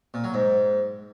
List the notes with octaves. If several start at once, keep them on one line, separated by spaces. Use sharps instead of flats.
A#2
F#3
G#2